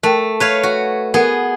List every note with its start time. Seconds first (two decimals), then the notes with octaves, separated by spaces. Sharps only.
0.03 A3 A#4 G5
0.40 B4 C#5 F5
0.63 F#4
1.14 B3 G#4 A#4 F#5